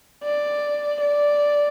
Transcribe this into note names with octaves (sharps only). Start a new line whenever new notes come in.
D5
D5